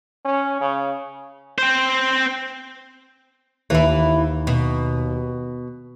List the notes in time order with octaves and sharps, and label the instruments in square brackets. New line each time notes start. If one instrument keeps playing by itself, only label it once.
[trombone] C#4
C#3
[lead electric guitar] C4 C5
[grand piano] D#2 [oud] E3 E4
[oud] B2